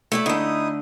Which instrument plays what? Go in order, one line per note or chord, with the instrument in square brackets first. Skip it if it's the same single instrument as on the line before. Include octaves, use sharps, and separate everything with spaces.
[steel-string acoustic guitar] A3 E4 D5
[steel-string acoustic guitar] D3 A3 [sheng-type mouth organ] D#4 E4 D#6